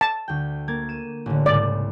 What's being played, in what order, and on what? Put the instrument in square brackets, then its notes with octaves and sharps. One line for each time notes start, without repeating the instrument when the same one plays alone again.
[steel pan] A5
[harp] D2 G5
A#3 G#6 A6
D#7 E7
A1 D3
[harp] C2 G#2 C#3 [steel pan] D5